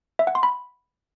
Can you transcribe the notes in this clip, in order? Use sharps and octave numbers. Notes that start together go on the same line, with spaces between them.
E5
F#5
C6
B5